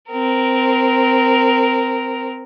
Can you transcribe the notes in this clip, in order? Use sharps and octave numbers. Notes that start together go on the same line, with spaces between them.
C4 A#4